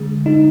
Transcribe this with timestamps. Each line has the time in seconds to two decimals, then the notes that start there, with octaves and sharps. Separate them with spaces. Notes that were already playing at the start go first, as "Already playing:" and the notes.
Already playing: D3 G#3
0.26 D3 G#3 D#4